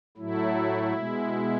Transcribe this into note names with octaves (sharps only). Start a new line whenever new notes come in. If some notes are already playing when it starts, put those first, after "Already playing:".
A2 F#3 A3 E4
B2 G#3